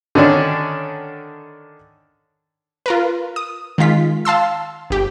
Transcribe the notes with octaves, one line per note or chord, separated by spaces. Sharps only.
D3 D#3 C#4 D4
F4 A#4 B4
D#6
D#3 G#3 F4 B6
F5 A5 C6 E6
G1 G4